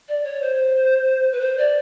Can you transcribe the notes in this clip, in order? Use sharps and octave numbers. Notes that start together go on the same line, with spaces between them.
D5
C#5
C5
B4
C5
D5